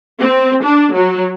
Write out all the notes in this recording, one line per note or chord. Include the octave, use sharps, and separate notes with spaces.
C4
D4
F#3